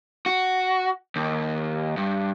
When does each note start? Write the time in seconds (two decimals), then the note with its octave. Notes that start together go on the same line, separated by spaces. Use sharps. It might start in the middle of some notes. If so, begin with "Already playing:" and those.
0.26 F#4
1.16 D#2
1.97 G2